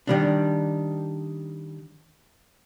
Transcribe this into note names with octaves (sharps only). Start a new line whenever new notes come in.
D#3 G3 D4